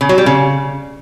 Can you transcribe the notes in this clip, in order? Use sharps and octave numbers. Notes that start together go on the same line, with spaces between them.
C#3
F#3
G3
C#3